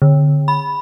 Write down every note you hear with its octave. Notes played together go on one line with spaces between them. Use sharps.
D3
B5